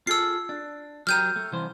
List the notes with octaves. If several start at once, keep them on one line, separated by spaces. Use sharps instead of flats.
F4 G#4 A4 E6 C7
D4
F#3 G4 A#4 F6 G6 D#7
A3
C2 E3 C5